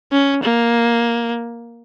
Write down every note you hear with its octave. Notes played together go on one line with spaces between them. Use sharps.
C#4
A#3